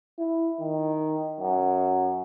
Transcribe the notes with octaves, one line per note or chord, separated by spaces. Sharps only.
E4
D#3
F#2